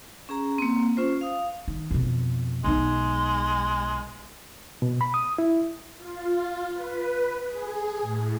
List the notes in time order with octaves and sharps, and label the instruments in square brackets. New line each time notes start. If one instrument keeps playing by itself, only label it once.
[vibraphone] C#4 G#4 A#5
A#3 C4
C#4 F4 C5
F5 D#6
[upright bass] D#3
F2 B2
[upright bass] B1 D#4 [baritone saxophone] G#3
[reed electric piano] B2
B5
D#6
E4
[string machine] F4
B4
G#4
A2